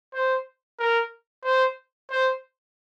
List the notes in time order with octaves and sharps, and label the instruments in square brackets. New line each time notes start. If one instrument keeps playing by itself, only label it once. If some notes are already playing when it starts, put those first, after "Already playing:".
[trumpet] C5
A#4
C5
C5